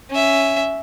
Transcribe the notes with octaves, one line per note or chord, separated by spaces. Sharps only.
C#4 E5